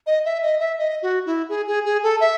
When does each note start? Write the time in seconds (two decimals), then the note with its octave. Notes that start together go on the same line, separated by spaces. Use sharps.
0.07 D#5
0.25 E5
0.43 D#5
0.60 E5
0.79 D#5
1.02 F#4
1.26 E4
1.49 G#4
1.67 G#4
1.85 G#4
2.03 A4
2.20 E5